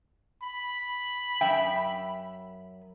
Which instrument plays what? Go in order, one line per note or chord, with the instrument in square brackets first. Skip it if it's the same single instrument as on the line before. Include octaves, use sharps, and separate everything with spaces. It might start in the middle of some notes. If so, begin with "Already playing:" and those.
[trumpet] B5
[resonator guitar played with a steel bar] F#2 E5 G5